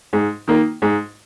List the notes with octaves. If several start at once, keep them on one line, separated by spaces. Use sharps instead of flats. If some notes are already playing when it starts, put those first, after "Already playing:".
G#2
D#3 A#3
G#2